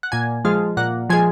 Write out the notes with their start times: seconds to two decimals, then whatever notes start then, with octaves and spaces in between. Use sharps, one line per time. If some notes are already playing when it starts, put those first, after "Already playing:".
0.03 F#5
0.12 A#2 G#5
0.45 F3 G#3 F5
0.77 A#2 F#5
1.10 F3 G#3 G#5